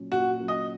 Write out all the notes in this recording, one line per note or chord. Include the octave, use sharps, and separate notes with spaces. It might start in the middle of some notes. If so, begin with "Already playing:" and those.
Already playing: A#2 F#3 C#4
A#2 F#4
F#3 C#4
D#5